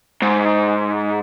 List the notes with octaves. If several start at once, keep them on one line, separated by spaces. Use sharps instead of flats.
G#2